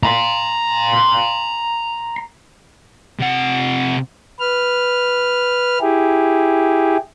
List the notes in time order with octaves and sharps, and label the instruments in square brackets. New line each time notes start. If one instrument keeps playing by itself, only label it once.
[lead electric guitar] A#5 C6
[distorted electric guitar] C3 F#5
[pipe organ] B4 F6
E4 G4 G#4